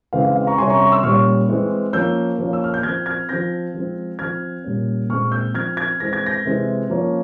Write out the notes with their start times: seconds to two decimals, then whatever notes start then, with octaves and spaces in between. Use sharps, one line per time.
0.13 C#3 E3 G#3 C4 F5
0.24 F5
0.36 F5
0.47 A#5 C#6
0.58 C3 G3 C#4 G#5 C6
0.70 A#5 C#6
0.80 A#5 C#6
0.92 C6 E6
1.03 A#2 G3 C#4 C#6 F6
1.49 E3 G#3 C4
1.93 F3 A#3 C#4 E6 G6
2.39 F3 A#3 C#4
2.53 E6
2.64 F6
2.74 G6
2.83 F3 C4 F6 G#6
3.06 F6 G#6
3.29 F3 C4 G6 A#6
3.74 F3 G#3 C4
4.19 F3 C4 F6 G#6
4.64 A#2 G3 A#3 C#4
5.09 A#2 G#3 C4 C#6 F6
5.32 E6 G6
5.55 F3 C4 F6 G#6
5.77 F6 G#6
6.00 E3 G#3 C4 A#6
6.13 G#6
6.26 G6 A#6
6.45 C3 E3 G#3 C4
6.90 F3 A#3 C#4